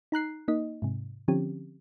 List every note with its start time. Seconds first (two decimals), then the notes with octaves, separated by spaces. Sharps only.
0.12 D#4 A#5 F#6 C7
0.48 A#3 D#4 D#5
0.82 G#2 C3
1.28 D3 F3 C4 C#4 G4